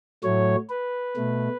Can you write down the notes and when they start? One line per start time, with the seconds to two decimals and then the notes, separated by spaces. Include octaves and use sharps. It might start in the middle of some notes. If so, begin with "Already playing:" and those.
0.23 A2 F#3 A3 C#5
0.70 B4
1.16 B2 A3